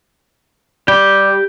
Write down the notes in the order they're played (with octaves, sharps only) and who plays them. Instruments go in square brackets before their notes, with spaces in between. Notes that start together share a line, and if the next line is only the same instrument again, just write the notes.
[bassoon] G3 [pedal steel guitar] G4 G5